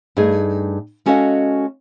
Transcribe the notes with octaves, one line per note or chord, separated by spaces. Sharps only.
G2 A3 D#4 G#4
G#3 C#4 F#4 A4 D#5 F5